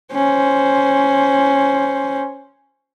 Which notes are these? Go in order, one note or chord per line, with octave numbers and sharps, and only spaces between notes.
C#4 C5